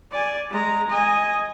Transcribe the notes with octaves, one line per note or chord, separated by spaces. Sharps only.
D5 G#5
G#3 A#5
D#5 G#5